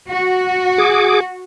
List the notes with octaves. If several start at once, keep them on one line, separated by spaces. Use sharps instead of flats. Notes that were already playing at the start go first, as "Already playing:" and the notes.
F#4
G#4 D6